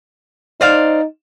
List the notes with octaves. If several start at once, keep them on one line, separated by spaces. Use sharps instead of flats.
D#4 C5 D5 F5